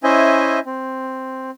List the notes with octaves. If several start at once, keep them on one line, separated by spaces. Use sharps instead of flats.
C#4 E4 C5 D#5 E5 G#5
C4